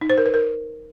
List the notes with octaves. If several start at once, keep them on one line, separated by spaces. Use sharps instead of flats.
D#4
C5
A#4
B4
A#4